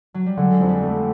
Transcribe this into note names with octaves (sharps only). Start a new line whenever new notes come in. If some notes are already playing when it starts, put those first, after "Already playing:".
F#3
G3
D3 G#3
F2 G#3
G3
A3